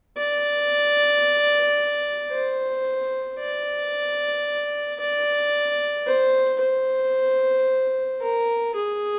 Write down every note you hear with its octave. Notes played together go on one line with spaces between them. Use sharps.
D5
C5
D5
D5
C5
C5
A#4
G#4